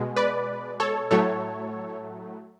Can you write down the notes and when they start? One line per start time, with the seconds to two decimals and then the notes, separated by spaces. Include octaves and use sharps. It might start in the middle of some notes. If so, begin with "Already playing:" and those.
Already playing: B2 G#3
0.16 B4 D5
0.80 A4 C#5
1.11 A2 F#3 A3 A4 C#5